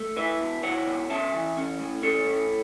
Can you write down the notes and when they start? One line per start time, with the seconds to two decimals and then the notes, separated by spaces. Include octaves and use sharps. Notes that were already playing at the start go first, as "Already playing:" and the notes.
Already playing: A3
0.16 E4 B4 E5
0.40 B2
0.63 E4 C#5 F#5
0.87 B2
1.10 C#4 E5 A5
1.34 E3
1.57 C#4
1.80 A2
2.03 C#4 A4 C#5
2.27 A2